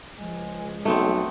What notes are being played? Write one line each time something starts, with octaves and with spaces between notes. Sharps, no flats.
C#2 F3 G#3
B1 A3 B3 C4